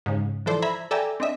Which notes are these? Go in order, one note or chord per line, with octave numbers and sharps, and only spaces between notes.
G#2 C#3
E3 F3 A4 C5 D5
E5 A#5 B5 G#6
A4 D5 E5 G5 G#5 A#5
C4 D4 D#5 E5